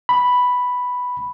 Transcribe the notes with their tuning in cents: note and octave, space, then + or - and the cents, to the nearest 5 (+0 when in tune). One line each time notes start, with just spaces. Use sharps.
B5 +0